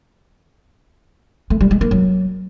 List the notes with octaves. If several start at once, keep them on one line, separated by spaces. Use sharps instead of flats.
A3
G3
G#3
A#3
F#3